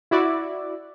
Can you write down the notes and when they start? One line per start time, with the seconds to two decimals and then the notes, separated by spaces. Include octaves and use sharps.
0.11 E4 F#4 D5